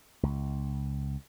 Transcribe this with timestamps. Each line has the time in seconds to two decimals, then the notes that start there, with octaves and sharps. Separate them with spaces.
0.23 C#2